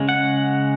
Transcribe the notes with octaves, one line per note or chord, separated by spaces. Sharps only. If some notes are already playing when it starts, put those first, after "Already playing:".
Already playing: C#3 G#3 C#4
F#5